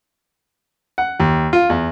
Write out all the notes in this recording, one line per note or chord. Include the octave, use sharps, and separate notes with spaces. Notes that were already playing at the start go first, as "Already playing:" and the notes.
F#5
D#2
F4
E2